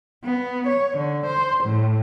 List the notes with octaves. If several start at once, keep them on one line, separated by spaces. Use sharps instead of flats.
B3
C#5
D3
C5
A2